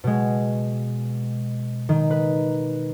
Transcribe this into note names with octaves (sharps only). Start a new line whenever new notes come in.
B2 G#3
D#3
B4